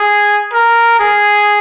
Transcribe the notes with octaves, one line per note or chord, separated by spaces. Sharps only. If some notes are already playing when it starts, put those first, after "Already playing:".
Already playing: G#4
A#4
G#4